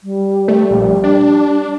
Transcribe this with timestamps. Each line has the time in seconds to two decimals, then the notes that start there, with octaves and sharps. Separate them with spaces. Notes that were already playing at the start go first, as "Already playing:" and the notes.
0.03 G3
0.48 A3
0.71 A#1
1.04 D4